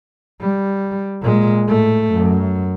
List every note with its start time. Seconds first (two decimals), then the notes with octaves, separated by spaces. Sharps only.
0.41 G3
1.22 A#2 G#3
1.65 A2 A3
2.12 F#2